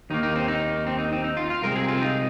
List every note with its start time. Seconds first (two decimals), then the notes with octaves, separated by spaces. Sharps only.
0.10 D#2 D#3 A#3 D#4
0.23 D#4
0.36 C4
0.48 D#4
0.87 C4
0.98 D#4
1.12 C4
1.24 D#4
1.37 F4
1.50 F4
1.62 C2 C3 G#3 C4 A#4
1.76 G#4
1.88 F4
1.95 C4
2.02 D#4